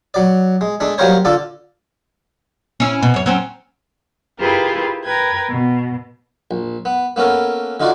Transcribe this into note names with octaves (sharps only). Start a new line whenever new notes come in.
F#3 D5
G#3
G#3 A3 D4
F#3 G3 A#3 A#4 C5 C#5
D3 F4 A4 D5
C#4 E4
B2
F#2 C#5
F#3 C4 C#4
E4 F4 G4 G#4 A#4 B4
A#4 B4 G5 G#6
B2
A#1
B3
A#3 B3 C#4 A4 A#4
D3 D#4 F4 F#4 D5